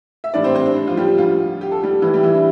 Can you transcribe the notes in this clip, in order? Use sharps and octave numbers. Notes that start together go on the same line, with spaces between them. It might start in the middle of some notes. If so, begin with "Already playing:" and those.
E5
A2 E3 G3 D4 D5
C4 C5
C4 C5
D4
D4
F3 F4
G3 G4
D2 D3 F3 G3 F4
G4
A4
G3 G4
A2 E3 G3 E4
G3 G4
E3 E4
D4